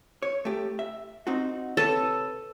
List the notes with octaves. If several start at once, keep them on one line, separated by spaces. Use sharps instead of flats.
C#5
A3 G4
E5
C4 D#4 F#4
C3 A4 B4 C#5